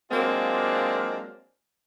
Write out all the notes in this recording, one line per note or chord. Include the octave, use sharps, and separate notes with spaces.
F#3 G#3 A#3 C4 D4 F4